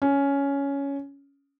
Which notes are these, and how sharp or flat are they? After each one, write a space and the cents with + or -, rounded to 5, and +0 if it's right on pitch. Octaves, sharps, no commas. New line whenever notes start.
C#4 +10